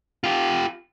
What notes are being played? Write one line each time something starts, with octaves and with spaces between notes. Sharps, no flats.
F4 G4